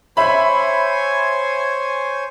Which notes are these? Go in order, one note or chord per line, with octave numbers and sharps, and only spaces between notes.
C5 C#5 E5 G#5 B5